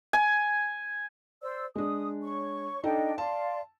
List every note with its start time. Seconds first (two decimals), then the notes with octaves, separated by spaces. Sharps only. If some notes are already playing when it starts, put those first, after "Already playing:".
0.13 G#5
1.43 C5 D5 E6
1.76 G#3 D4 D#6
2.23 C#5 C#6
2.84 D4 D#4 A4 D#5 G5
3.18 D5 F5 A5 C6